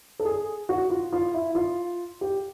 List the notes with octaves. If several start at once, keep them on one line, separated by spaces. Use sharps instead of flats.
A4
G#4
F#4
F4
F4
E4
F4
G4